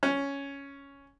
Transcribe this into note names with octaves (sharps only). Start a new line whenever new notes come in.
C#4